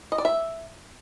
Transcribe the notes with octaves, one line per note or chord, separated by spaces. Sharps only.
D#5
D5
E5